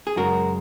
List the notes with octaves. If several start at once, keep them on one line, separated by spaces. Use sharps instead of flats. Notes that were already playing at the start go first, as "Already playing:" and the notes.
G#4
F#2 C#3 G#3 F#4 A#4